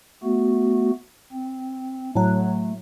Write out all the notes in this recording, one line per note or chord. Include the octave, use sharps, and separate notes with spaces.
A3 B3 F#4
C4
A2 F#3 A3